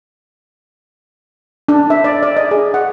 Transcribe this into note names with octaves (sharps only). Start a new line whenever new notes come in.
D4
E5
D5
D5
D#5
G#4
F#5